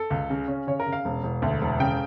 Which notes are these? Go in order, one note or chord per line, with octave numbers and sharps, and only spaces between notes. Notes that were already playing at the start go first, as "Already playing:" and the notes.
Already playing: A4
C#2
C#3
C#4
C#3 C#5
A#4
C#3
F5
E1
E1
D2
E1
C#3 G5